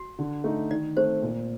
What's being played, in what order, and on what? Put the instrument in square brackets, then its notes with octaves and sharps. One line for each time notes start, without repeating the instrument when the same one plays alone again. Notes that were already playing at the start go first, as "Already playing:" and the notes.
Already playing: [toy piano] F#4
[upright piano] D3
A3 D#4
[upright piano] D#3 [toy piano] D5
[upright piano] A3 C4 [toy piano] C5
[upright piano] A#2